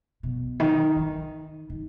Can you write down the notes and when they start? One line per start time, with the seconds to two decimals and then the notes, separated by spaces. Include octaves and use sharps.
0.23 B2
0.60 D#3
0.96 D#3
1.70 D#3